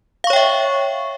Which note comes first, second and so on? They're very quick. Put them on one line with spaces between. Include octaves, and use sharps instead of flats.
F5 C#6 C#5 G5 E5